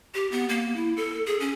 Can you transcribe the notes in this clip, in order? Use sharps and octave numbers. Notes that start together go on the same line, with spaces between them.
G4
B3
A#3
E4
A4
G#4
C#4